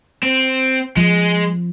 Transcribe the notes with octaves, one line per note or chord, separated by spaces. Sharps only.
C4
F3 G#3